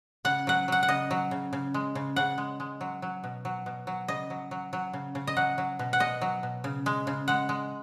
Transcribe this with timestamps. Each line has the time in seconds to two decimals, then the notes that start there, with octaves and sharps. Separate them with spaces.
0.25 C#3 F#5
0.47 F#3 F#5
0.68 F#3 F#5
0.83 F#5
0.89 C#3 D#5
1.11 F#3
1.31 C#3
1.53 C#3
1.74 G#3
1.95 C#3
2.16 C#3 F#5
2.38 G#3
2.60 G#3
2.81 F#3
3.02 F#3
3.24 B2
3.45 F#3
3.66 B2
3.87 F#3
4.08 C#3 D#5
4.30 F#3
4.51 F#3
4.73 F#3
4.93 C#3
5.15 C#3
5.27 D#5
5.36 F#3 F#5
5.58 F#3
5.79 B2
5.93 F#5
6.00 B2 D#5
6.21 F#3
6.43 B2
6.64 C#3
6.86 G#3
7.07 C#3
7.28 G#3 F#5
7.49 G#3